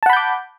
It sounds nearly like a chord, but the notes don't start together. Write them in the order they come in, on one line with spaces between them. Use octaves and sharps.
A5 F#5 B5 G6 D6